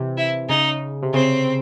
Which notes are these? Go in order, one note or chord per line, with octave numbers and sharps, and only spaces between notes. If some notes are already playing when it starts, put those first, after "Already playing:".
Already playing: C3 E3
E4
C#3 D#4
C3
C#3 C4